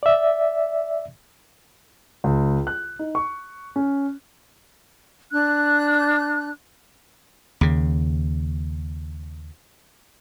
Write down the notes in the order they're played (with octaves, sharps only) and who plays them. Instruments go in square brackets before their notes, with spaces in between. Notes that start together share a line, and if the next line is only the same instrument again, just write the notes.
[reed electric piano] D5 E5
[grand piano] C#2
F#6
D#4
C#6
C#4
[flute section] D4 F#6
[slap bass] D#2 C#3